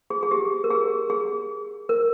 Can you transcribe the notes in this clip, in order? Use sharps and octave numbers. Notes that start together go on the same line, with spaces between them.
G#4
G#4
G4
A#4
G#4
G#4
A#4